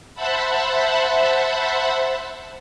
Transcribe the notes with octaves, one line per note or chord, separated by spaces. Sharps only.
C5 E5 F#5 A5 B5